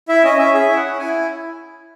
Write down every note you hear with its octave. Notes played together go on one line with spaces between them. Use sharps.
E4 E5
C#4 D#5
C#4 E5
G#4 E5
E4
F#5
C#4
E4 G#5